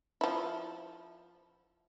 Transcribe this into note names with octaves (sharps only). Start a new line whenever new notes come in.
F3 E4